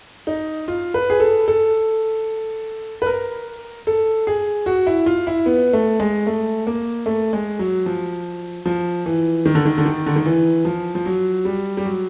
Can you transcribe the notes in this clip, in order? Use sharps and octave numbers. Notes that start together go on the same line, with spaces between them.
D#4
F4
B4
G#4
A4
A4
B4
A#4
A4
G#4
F#4
E4
F4
E4
B3
A3
G#3
A3
A#3
A3
G#3
F#3
F3
F3
E3
D#3
D3
D#3
D3
D#3
D3
D#3
E3
F3
F3
F#3
G3
G3
F#3